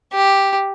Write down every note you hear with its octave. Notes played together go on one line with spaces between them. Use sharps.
G4